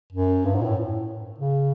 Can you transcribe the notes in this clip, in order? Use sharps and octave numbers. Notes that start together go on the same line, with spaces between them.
F#2
G2
G#2
A#2
A2
C#3